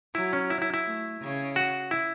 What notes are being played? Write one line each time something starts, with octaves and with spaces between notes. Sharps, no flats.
F#3 E4
C#4
E4
E4
E4
A3
C#3
F#4
E4